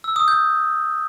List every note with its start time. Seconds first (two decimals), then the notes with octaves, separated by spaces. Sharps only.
0.04 E6
0.16 D#6
0.28 G6